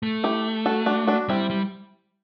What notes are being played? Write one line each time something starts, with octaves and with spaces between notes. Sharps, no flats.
A3
E4 G4
F#4 A4
D4 F#4
D4 F#4
G3 C4 E4
G3